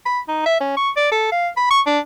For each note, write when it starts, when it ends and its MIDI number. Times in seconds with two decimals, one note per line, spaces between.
0.06 0.20 83
0.28 0.44 63
0.46 0.57 76
0.60 0.74 61
0.77 0.90 85
0.96 1.09 74
1.12 1.32 69
1.32 1.48 77
1.57 1.68 83
1.71 1.81 85
1.86 1.99 62